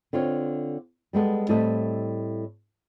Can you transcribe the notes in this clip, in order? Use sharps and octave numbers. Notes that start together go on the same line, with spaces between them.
D3 C4 F4 C#5
G3 G#3 B3 A4
A2 G3 C4 A4 D#5 E5